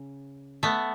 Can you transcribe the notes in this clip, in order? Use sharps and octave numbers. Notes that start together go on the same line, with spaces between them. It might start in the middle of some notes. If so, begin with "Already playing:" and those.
Already playing: C#3
A3 B3